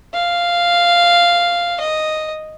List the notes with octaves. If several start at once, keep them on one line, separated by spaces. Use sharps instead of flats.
F5
D#5